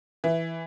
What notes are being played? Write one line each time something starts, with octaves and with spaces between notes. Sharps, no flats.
E3